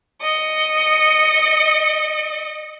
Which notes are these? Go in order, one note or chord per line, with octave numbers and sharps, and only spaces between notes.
D#5 C#7